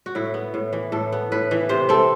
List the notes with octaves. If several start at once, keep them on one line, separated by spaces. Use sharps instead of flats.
F#4
A2 E4
B3
A2
E3
A2 A4
B3
A2 B4
E3
C3 C5
C4 A4